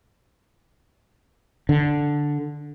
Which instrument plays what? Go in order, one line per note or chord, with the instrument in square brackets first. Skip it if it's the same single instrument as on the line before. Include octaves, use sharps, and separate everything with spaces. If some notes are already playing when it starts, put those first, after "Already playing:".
[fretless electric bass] D3